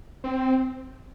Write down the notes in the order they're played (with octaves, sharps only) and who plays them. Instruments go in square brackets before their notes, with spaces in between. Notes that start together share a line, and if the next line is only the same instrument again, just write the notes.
[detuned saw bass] C4